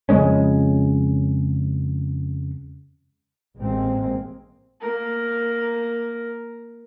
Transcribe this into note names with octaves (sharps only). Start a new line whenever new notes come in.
F2 C#3 G#3 C#4
A1 G#3 A#3 C4
A#3 A#4